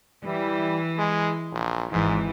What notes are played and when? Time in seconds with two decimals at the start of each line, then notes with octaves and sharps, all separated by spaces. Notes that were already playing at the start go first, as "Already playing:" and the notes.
0.24 E3 G3
0.98 G#3
1.52 A#1
1.92 G#1 G#2 E3